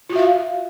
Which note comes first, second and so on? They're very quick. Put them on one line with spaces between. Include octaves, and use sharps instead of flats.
F4 F#4 E5 F5